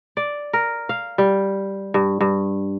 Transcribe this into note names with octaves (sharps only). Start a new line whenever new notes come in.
D5
A#4
F5
G3
G2
G2